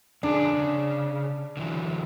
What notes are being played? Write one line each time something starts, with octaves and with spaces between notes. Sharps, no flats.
F2 D3 D4 G#4
C#3
D3 E3 F#3